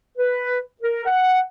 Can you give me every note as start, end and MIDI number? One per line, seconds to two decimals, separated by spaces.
0.18 0.58 71
0.82 1.04 70
1.06 1.39 78